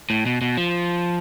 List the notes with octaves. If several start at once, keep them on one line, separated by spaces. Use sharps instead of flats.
A2
B2
B2
F3